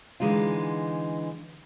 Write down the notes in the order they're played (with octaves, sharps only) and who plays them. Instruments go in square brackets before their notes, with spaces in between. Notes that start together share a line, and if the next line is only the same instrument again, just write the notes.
[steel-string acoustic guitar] D3 E3 G#3 D#4 F4